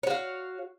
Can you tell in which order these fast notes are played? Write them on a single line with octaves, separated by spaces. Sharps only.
C#5 F#4 F5